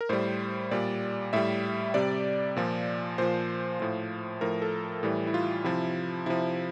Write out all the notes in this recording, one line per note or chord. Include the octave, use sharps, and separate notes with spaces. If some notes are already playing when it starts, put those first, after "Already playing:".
A#4
A2 G3 C5
A#2 G3 D5
A2 G3 E5
C3 G3 D5
A#2 F3
A#2 F3 C5
A2 F3
A2 F3 A#4
A4
A2 E3 G3
E4
F4
C3 F3 E4
C3 F3 E4